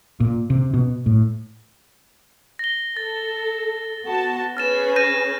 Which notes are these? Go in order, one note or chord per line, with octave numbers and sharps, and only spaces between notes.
A#2
C3
B2
A2
A#6 G7
A4 A6
B3 F#4 A5
C#4 G#4 B4 F6 A6 E7
G6 A#6 D#7